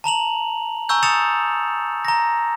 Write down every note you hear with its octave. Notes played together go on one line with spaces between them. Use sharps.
A5 A#5 F7 F#7
G#5 A#5 C#6 E6 G6
D#6 A6 C#7 E7 F7
A#5 A#6